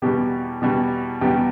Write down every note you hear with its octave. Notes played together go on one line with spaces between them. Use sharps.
E2 B2 G3 G4
E2 B2 G3
E2 B2 G3 G4